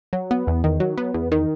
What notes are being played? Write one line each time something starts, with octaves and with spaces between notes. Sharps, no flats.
F#3
B3
E2
D#3
F#3
B3
E2
D#3